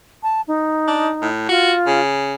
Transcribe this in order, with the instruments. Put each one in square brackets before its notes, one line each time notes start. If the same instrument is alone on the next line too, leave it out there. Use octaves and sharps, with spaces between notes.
[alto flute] A5
D#4
[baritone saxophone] D4
A2
[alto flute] F4 [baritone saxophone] F#4
[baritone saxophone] C#3